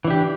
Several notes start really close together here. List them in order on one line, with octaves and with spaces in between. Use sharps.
E3 D4 G4